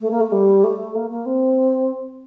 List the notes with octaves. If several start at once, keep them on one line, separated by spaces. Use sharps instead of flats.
A3
A#3
A3
G3
A3
A#3
A#3
C4